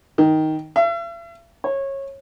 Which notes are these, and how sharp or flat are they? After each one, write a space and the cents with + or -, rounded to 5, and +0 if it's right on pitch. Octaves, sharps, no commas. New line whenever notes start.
D#3 +10
E5 +45
C#5 -20